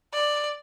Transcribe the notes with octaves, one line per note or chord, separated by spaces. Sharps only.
D5